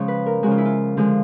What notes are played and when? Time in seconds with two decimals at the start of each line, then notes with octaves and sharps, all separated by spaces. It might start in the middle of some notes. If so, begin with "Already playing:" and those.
Already playing: C#3 F3 G#3 C#5
0.08 B4
0.26 A#4
0.43 C#3 F3 G#3 F#4
0.51 F4
0.58 E4
0.65 F4
0.97 D3 F3 G#3